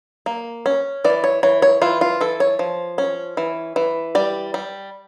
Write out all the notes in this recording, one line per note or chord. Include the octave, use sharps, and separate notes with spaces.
A#3
C#4
E3 D5
C#5
E3 C#5
C#5
E3 F4
F4
E3 A4
C#5
F3
C#4
E3
E3
G3 D5
G3